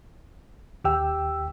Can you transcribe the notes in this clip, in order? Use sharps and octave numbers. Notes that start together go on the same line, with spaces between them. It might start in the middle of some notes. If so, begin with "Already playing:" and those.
D#2 G4 G5 E6